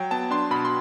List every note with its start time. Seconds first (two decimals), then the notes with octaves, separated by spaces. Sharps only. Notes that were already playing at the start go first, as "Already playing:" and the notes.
Already playing: F#3 G5
0.11 B3 A5
0.31 D4 C6
0.51 B2 B5
0.65 C6